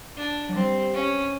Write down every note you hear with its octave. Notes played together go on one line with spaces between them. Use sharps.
D4
F#3
G3 C4
C#4